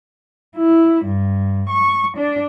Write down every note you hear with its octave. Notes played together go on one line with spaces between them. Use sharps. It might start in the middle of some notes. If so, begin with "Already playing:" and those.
E4
G2
C#6
D4